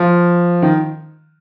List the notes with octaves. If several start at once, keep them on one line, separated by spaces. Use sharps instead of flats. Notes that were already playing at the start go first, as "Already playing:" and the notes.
Already playing: F3
D#3